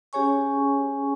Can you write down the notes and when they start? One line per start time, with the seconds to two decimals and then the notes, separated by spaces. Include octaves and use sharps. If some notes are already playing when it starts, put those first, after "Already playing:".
0.13 C#4 G4 G#4 C#5 G#5 C#6